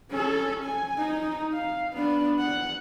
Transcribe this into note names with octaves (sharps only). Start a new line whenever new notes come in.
C#4 A4
G#5
D#4
F5
B3 D4
F#5